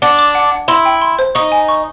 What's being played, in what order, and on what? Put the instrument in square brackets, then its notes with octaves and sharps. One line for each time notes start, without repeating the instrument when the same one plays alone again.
[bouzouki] D4 [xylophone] F#5
[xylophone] D6
F#5
F#5
[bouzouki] E4 [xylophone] C6
[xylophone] G5
C6
C5
[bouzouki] D#4 [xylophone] C#6
[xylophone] G#5
C#6